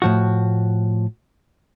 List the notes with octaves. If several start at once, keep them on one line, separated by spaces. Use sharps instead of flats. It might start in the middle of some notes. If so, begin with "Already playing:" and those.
A2 F3 F#4